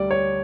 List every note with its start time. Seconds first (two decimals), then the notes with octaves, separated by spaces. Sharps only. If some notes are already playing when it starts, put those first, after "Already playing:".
Already playing: D2 D3 G3 D5
0.11 C#5